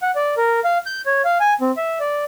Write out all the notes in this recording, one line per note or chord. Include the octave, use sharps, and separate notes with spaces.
F#5
D5
A#4
F5
G6
C#5
F5
G#5
C4
E5
D5